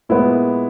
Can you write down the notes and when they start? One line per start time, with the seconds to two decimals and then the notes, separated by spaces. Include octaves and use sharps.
0.09 A#2 G#3 B3 E4